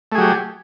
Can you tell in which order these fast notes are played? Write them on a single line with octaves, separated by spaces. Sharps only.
A3 G#4 F#3 G4